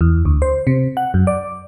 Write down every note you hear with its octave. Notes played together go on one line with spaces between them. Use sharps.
E2
D2
C5
C3
F#5
F#2
D5